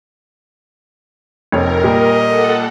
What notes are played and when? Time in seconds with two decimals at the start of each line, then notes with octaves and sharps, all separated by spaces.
1.52 F1 F2 A#4 C#5
1.83 A#2 G3 D#5
2.26 A4 F#5